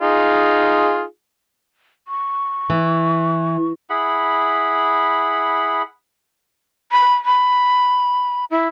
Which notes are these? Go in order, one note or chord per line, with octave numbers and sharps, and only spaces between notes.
D#4 F4 G#4
C#6
E3
E4 G#4 F#5 B5
B5
B5
E4